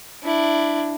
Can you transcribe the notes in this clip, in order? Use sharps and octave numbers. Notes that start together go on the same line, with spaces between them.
D4 E4